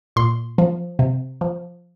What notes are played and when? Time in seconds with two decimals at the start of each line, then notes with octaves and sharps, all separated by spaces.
0.16 A#2 C6
0.58 F3
0.99 C3
1.41 F3